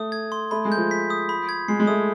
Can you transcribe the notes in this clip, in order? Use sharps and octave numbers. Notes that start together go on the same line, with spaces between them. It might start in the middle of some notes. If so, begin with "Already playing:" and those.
Already playing: A3 D#6
G#6
C6
A3 B5
G#3
G6
F3
B6
D#6
B5
G#6
G#3 C7
G#3
A3 D#6